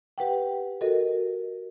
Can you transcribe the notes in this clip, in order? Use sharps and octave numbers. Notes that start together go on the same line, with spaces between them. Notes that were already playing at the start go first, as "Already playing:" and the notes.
G4 B4 F#5 G5
F#4 A4 A#4 D#5